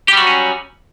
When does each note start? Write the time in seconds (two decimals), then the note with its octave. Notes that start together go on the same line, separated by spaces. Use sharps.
0.08 G4
0.13 G3
0.17 F#4
0.22 F#3
0.27 C#4